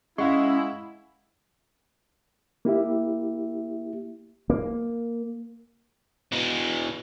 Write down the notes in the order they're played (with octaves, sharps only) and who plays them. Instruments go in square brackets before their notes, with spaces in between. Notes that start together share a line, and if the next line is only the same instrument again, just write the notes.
[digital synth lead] G#3 [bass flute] C#4 [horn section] E4 [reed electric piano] F5 F#5 C#6
[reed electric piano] A#3 E4 G4 E5
[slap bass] A#3
[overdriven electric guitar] B2 E3